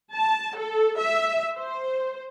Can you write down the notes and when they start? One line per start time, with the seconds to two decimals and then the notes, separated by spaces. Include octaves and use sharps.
0.14 A5
0.57 A4
0.98 E5
1.57 C5